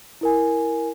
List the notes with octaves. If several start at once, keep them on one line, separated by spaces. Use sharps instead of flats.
E4 A#4 G#5